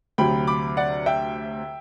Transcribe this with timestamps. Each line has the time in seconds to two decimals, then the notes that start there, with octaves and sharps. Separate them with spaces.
0.18 D2 C3 F#3 G5 B5
0.47 B5 D6
0.77 D5 F#5
1.06 E5 G5